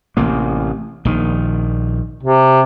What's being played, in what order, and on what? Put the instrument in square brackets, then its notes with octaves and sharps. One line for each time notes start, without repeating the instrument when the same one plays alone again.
[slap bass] A1 C3 A#3
A#1 D#3
[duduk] C3